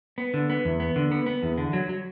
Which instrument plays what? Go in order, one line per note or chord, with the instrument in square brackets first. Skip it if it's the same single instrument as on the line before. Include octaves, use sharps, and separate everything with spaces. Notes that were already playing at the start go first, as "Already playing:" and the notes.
[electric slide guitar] B3
D3
B3
E2
B3
D3
B3
B3
E2
D3
F#3
F#3